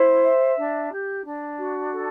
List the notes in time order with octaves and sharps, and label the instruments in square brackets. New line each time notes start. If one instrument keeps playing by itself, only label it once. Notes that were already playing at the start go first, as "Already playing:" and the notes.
Already playing: [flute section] E4 C5
E5
D4
G4
D4
F#4
A4